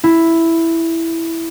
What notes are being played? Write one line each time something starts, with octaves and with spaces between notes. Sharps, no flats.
E4